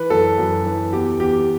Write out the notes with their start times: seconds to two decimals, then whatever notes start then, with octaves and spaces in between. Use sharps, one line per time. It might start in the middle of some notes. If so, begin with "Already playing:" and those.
Already playing: E3 B4
0.10 F#2 A4
0.38 F#2
0.66 E3
0.93 E2 G4
1.20 E2 G4